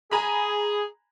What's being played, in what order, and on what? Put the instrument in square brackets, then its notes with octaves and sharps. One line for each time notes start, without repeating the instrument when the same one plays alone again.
[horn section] G#4 [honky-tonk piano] G#5 A#5 B5